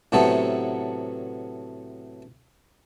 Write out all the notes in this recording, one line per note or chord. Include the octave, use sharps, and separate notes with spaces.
A2 C3 F#3 A3 B3 A4